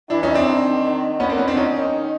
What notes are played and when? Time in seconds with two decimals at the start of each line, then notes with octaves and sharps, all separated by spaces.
0.10 E3 D4 E4
0.23 C#4 D#4
0.34 C4 D4
0.47 D#3
0.84 D#3
1.20 D3 B3 C#4
1.29 A#3 C4
1.38 B3 C#4
1.48 C4 D4
1.56 D#3 C#4 D#4